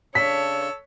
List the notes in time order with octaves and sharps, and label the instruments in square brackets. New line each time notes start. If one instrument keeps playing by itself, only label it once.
[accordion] C#3 D4 [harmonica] A4 [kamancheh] C#5 [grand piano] B6